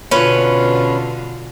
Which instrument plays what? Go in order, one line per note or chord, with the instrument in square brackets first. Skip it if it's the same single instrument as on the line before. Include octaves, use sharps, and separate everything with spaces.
[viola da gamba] B2 D3 F4 [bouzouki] C#4 B4